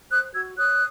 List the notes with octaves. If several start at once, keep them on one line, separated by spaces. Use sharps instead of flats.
C5 D#6 F#6
F#4 E6 G#6
C#5 D#6 F#6